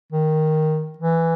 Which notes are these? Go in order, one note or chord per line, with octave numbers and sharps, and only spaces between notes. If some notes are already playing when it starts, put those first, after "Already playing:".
D#3
E3